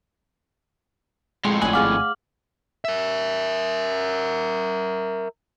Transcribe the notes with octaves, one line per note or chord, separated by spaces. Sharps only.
F2 A2 G#3 C6
G#1 A3 D5 G#5 F#7
G#4 F5 F#5 D6 F6
A#4 E5